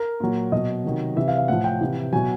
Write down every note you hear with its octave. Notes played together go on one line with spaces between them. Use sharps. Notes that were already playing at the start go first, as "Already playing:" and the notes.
Already playing: A#4
A#2 F#3
B2 F#3 D#5
C3 D#3 F#3
C3 E3 E5
F5
F5
A2 F3 F#5
G5
C3 E3
B2 F#3 G#5